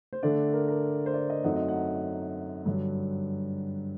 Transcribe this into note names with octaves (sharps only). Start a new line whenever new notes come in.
C5
D3 A3 D4 D5
A#4
A#4
C5
D5
D#5
F#2 F#3 A3 C4 D#4 F#5
D#5
F#5
G2 D3 F#3